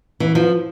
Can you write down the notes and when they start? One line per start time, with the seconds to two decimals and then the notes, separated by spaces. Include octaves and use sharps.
0.20 E3
0.35 F3